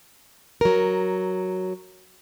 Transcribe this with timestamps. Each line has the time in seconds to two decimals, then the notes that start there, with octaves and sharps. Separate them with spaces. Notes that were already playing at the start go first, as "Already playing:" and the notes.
0.61 F#3 A#4